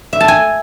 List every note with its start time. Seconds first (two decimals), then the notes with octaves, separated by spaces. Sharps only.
0.13 E5
0.20 A5
0.28 G#5